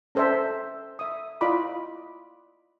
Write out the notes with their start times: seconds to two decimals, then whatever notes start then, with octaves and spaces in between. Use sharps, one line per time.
0.15 C#4 A4 C5 D5 E5
0.99 E5 D#6
1.41 E4 F4 D5 D#5 B5 D6